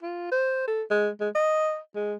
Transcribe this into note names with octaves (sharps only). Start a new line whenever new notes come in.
F4
C5
A4
G#3
G#3
D#5
G#3